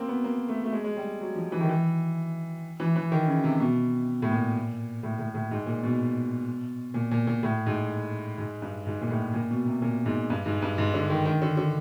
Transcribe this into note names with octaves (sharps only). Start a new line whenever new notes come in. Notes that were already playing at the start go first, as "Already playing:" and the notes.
Already playing: A#3 C4
B3
A#3
A3
A3
G#3
G#3
G3
F#3
F3
E3
D#3
E3
E3
E3
D#3
C#3
C3
B2
A2
A#2
A2
A2
A2
G#2
A#2
B2
A#2
A#2
A#2
A2
G#2
G#2
G2
G#2
A#2
A2
A#2
B2
C3
A#2
G#2
G2
G#2
G2
G#2
D3
D#3
D#3
D3
D3